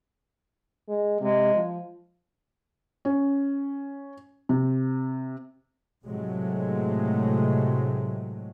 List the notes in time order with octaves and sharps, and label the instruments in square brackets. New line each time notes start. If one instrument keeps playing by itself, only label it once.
[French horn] G#3
[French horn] C3 [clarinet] G#3
[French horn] F3
[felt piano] C#4
C3
[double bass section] A2 C3 F#3 G#3 A3